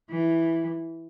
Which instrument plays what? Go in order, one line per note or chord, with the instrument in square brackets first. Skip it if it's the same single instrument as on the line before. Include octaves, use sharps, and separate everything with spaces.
[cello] E3